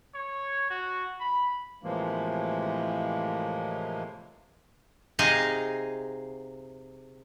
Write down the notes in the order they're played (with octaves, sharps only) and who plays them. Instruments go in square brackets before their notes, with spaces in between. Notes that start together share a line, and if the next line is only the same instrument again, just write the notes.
[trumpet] C#5
F#4
B5
[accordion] A2 C3 E3 F3 G#3 A#3
[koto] C3 D#4 G#4 D#5 F5 G#5